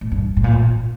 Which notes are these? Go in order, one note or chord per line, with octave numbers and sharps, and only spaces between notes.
A2
G2
A2
A#2
A2
A#2